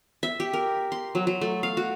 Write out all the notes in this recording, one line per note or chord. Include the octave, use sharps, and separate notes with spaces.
E5
G4
A#4
C6
F#3
F#3
A3
F5
F#4